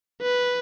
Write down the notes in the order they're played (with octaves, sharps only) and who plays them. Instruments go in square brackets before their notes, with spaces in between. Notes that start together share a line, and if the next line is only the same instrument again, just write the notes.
[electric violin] B4